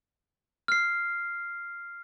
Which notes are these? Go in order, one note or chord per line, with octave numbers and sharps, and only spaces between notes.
F6 C7